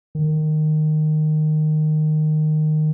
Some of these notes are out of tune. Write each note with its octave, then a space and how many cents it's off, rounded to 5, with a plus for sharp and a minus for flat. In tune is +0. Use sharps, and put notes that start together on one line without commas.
D#3 -15